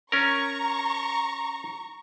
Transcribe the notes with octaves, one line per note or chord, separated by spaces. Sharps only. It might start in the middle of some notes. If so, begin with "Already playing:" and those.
C#4 A#4 A#5 C#6